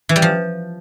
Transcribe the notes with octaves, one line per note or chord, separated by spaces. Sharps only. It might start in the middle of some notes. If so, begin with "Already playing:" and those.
E3
G3
F3